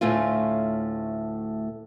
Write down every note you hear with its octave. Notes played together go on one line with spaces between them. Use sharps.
D2 A2 A3 C#4 F4